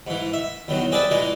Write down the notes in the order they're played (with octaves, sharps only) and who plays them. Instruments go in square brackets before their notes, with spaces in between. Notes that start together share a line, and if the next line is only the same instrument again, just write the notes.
[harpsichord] G#2 E3
E5
E2 D#3 F#3
C4 G#4 B4 D5 E5
A#2 E3 G#3 A#3